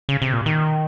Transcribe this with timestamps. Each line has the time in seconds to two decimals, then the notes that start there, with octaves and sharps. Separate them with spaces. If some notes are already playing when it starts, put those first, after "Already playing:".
0.09 C#3
0.22 C3
0.33 A#2
0.46 D#3